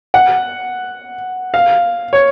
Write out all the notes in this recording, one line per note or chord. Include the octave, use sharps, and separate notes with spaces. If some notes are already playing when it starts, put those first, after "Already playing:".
F#5
F5
C#5